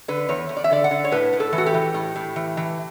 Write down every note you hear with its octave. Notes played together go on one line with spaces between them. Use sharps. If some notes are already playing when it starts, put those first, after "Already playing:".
D3 B4
E2 C#5
E2
D5
E5
D3 D5
F#5
D3
C#5
A2 B4
A2
A4
E3
F#4
G4
E3
A2
A2
E3
E3